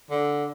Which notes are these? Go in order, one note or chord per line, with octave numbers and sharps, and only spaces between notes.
D3